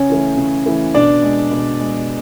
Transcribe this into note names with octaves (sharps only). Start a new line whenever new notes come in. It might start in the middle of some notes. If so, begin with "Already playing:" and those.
Already playing: C#3 C#4 C#5
E3 A3
C#3
E3 A3
B2 D4 D5
G#3
B2
G#3